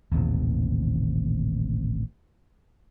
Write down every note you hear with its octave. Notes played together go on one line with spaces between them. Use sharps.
D#1 A1 D#2 C3